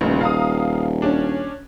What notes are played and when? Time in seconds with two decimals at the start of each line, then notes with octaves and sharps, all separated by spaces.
0.01 D#1 A1 C#3
0.21 F5 A#5 D#6
1.02 C#4 D4